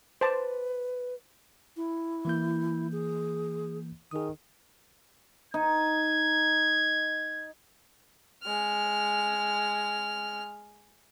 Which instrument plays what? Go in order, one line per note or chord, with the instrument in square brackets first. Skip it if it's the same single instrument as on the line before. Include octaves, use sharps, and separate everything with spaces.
[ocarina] B4 [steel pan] C5 A5 D6
[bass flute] E4
[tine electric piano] E3 A#3 G6
[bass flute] G#4
[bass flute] D#3 [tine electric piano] G#4 D#6
[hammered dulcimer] D#4 [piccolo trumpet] G#6
[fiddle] G#3 F6